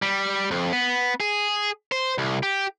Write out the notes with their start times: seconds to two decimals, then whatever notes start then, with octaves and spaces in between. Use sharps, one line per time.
0.02 G3
0.51 F2
0.73 B3
1.20 G#4
1.92 C5
2.18 C2
2.43 G4